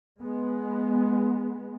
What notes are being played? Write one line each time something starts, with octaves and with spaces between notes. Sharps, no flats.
G#3 B3